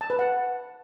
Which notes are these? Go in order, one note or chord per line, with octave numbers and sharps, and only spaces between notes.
A5
B4
F#5